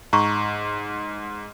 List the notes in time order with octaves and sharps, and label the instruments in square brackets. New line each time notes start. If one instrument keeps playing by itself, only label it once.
[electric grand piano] G#2 [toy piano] A#5 C#6